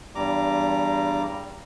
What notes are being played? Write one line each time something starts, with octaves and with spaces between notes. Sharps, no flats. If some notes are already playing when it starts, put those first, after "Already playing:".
E2 G2 G3 A#5 D6